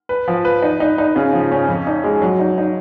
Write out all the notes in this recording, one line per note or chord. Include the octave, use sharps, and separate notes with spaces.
B4
F3
B4
D#4
D#4
D#4
C#3
F3
C#4
F2
D#4
G#3
F#3
D#4
D#4